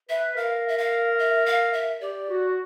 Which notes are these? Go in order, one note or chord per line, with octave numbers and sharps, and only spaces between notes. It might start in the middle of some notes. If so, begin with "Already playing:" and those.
B4 E5
A#4 F5
E5
F5
E5
F5
E5
G4 D5
F#4